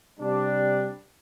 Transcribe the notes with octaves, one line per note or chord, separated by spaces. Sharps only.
C3 G3 D4